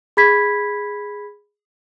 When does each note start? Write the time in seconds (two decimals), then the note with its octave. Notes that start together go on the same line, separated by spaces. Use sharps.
0.17 G#4 B5 G#6 B6